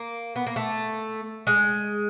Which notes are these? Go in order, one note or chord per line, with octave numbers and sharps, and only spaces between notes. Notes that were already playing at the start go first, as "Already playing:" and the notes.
Already playing: A#3
B3
A#3
A3
G#3